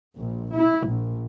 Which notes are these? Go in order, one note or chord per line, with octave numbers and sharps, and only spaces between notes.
A#1
E4
A#1